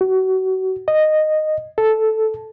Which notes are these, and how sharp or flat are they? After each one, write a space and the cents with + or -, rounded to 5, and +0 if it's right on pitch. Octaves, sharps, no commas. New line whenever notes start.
F#4 +30
D#5 -10
A4 -5